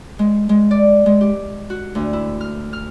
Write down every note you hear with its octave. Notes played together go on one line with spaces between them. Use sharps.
G#3
G#3
D5
G#3
G4
F#4
D2
E4
F6
F6